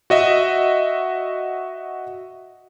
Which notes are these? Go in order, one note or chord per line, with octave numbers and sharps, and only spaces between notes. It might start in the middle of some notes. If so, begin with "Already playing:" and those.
F#4 D#5 E5